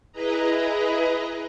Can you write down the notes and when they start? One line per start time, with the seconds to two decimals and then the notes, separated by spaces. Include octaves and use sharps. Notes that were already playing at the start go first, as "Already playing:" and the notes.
0.12 E4 G#4 B4 D#5 A#5